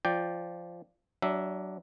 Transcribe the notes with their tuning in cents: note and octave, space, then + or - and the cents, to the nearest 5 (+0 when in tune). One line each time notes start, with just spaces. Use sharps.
F3 -10 D5 +0 G5 +0
F#3 +25 D4 +0 E5 +0